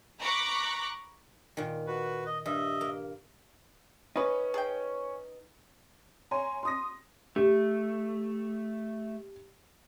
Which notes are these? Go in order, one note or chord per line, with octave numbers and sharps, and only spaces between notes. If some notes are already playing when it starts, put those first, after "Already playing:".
A#5 B5 C#6 D6 F#6
A#2 D#3
F#4 B4
D#5
G2 D#5 E5
A#3
C#4 D#4 B4
G#4 G5
C#5 G#5 A#5 C6
C6 D#6 A#6
A3 G4